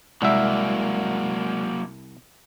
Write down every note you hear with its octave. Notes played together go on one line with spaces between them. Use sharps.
C2 F#3 G#3 A#3 D5 E5 F#5